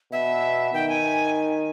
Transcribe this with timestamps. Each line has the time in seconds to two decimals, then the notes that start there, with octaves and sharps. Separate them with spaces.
0.12 B2 E5
0.73 D#3 G5
0.89 G#5